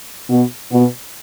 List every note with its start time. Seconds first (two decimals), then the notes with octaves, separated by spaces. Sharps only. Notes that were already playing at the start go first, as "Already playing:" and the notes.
0.29 B2 B3
0.71 B2 B3